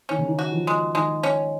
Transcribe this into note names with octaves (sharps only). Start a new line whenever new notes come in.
D#3 C#4
C#3
D#3
F#4
F3
G#3
D#3 G#3
C#4